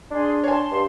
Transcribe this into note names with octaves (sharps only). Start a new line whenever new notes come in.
D4 G#4 C6
C#5 G#5 A5 C6
G2